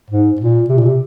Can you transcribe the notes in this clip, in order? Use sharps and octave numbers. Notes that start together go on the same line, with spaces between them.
G#2
A#2
C3
A#2
C3